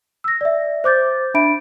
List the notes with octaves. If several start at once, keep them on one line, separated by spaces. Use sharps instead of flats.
E6 A#6
D5 E5
C5 D6 G6 A6
D4 E5 B5 D7